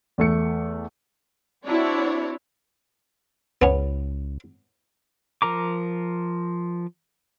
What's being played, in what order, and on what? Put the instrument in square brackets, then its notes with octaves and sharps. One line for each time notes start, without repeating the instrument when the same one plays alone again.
[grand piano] E2 A3 C#7
[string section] C4 D4 E4 F#4 C#5 D5
[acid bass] C#2 [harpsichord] B3 C#4
[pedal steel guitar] F3 A#4 A#5 D6